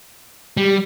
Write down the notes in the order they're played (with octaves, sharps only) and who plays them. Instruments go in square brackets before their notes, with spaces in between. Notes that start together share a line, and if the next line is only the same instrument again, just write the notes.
[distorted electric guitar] G3 [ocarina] G4